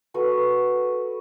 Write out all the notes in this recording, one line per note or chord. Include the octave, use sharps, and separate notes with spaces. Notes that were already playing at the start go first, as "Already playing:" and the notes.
F#4 A4 B4